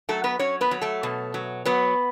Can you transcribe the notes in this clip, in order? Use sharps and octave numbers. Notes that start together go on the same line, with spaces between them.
F#3 A3 A4
B3 B4
F#3 C#4 C#5
B3 B4
F#3
A3 A4
B2
F#3
F#3 B3 B4